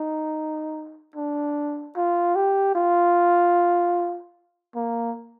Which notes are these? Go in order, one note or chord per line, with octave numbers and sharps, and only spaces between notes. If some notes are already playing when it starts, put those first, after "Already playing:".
Already playing: D#4
D4
F4
G4
F4
A#3